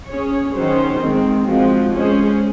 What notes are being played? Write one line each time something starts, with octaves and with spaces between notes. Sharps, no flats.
C#4 G#4 C#5
D#3 F#3 C#4 G#4 C5
D#3 G#3 C4
F3 G#3 C4 F#4
G#3 C#4 G#4 C5